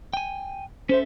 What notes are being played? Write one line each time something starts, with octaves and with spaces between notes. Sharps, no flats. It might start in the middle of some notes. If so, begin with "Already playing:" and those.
G5 G#5
C#4 A4 C5 E5